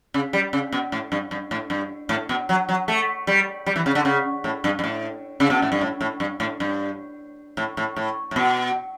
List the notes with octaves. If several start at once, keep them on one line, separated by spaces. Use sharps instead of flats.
C#3
G3
C#3
B2
A2
G2
G2
A2
G2
A2
B2
F#3
F#3
A3
G3
G3
E3
C#3
D3
C#3
A2
G2
G2
A2
C#3
B2
A2
G2
A2
A2
G2
A2
G2
A2
A2
A2
A2
B2